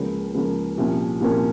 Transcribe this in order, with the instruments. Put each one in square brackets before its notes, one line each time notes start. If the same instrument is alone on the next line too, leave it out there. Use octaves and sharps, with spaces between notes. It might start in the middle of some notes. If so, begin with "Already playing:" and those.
Already playing: [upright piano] C#2 C#3 F3 A#3 C#4
C#2 C#3 F3 A#3 C#4
C2 A#2 F3 A#3 C#4
C2 A#2 F3 A#3 C#4